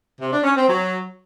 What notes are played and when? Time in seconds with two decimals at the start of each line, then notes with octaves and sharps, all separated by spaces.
0.20 C3
0.32 D4
0.43 C#4
0.55 C4
0.67 F#3